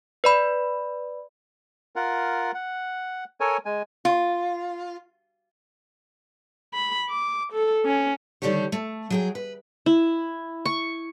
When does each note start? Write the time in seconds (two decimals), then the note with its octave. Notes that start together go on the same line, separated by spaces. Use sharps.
0.24 B4 D5 B5
1.96 F4 A#4 F#5
2.54 F#5
3.40 A4 A#4 C#5 G#5
3.66 G#3 G#5
4.05 F4
6.74 B5
7.09 D6
7.53 A4
7.85 C#4
8.42 D3 D#3 G3 A3 G4 C#5
8.72 A3
9.10 F#3 G#4 G5
9.35 B4
9.86 E4
10.65 C#6